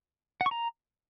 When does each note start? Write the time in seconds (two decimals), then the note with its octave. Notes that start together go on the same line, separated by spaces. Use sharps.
0.41 F#5
0.46 C#6
0.51 A#5